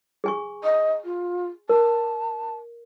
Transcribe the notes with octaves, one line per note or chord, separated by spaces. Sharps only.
G#4 G#5 C#6
D#5
F4
A#4 A5